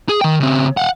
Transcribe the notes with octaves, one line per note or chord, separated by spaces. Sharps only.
G#4
D#3 G5
C#3 C4
F5 F#5